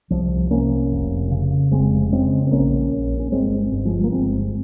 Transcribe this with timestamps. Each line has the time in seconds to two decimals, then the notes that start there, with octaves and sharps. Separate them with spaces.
0.10 C2 F3
0.51 C2 A#3 C#4
0.92 F1
1.31 C#3
1.71 F1 G#3 C4
2.12 C#3 G#3 C4
2.47 C4
2.51 A#1 A#3 C#4
2.92 A#1
3.20 C#4
3.32 G1 G#3 C4
3.72 G1
3.85 F3 G#3
4.04 A#3
4.12 G1 G#3 C4